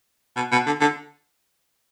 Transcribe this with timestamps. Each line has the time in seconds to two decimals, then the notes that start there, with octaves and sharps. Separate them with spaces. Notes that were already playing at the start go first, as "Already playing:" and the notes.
0.36 B2
0.52 B2
0.67 D3
0.81 D3